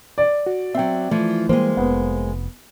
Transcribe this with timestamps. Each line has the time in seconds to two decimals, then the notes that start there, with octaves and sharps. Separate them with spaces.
0.18 D5
0.46 F#4
0.75 F#3 C4 E5 G5
1.11 E3 F3 A3
1.49 E3 F3 G3 G#3 A#3 C5
1.77 F1 B3